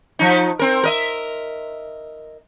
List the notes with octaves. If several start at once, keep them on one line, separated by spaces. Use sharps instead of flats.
F3 D#4
C4 A#4
A#4 D#5 E5